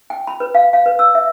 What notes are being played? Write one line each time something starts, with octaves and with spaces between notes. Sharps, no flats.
G5
B5
B4
F5
F5
B4
E6
E5